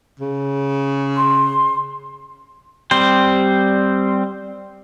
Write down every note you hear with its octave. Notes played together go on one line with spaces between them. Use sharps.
C#3
C6
G3 C4 C5